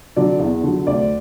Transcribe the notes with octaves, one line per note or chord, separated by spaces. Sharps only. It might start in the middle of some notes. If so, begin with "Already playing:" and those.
D3 F#3 D5
E2
D3 F#3
D2 D5